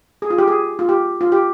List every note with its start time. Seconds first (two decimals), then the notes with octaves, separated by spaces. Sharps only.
0.22 G#4
0.30 F4
0.38 G4
0.48 G#4
0.79 F4
0.89 G4
1.21 F4
1.32 G4